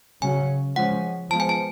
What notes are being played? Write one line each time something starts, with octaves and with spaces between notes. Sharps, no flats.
C#3 F#3 C#4 G#5
F3 G#3 C#4 F#5
F3 G#3 B3 A5
G#5
A5